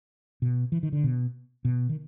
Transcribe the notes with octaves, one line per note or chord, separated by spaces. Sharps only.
B2
E3
D#3
D3
B2
B2
D#3